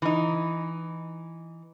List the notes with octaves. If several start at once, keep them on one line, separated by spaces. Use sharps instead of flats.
E3 D#4